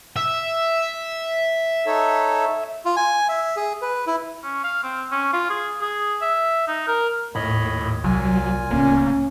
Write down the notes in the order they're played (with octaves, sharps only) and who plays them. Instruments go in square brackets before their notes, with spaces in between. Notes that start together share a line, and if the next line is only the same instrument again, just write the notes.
[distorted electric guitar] E5
[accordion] D#4 A4 C#5
[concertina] F4
G#5
E5
G#4
B4
E4
[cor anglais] C#4
F5
C4
C#4
F4
G#4
G#4
E5
D#4
A#4
[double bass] D#2 [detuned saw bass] A2 [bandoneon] C#5 D#5 B5
[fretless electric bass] C2 [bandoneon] A#2 F4 G#5 [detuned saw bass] F#3
[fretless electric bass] D1 C#2 [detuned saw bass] A#3 [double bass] C#4